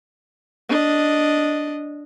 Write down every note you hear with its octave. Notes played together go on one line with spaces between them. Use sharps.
D4 D#5